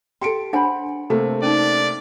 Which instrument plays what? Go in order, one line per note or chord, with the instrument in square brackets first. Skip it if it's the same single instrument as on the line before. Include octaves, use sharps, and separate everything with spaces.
[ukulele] G4 A4 [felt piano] C6 C#7 D7
[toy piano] D4 F#5 G#5 [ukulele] C5 B5
[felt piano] C3 A3 A#3 [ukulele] A4
[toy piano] C#4 D#4 [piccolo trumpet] D5